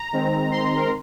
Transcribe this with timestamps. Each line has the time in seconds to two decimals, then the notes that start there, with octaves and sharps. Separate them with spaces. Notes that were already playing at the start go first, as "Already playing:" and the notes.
Already playing: A#5
0.12 D#3 G#3 C4
0.51 C6
0.76 A#4